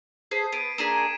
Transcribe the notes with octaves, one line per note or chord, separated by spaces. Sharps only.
G#4 A4 C5 G#6 B6 C7
B3 D7 D#7
A#3 D4 G#4 B6 D#7 E7
G#6 B6 D#7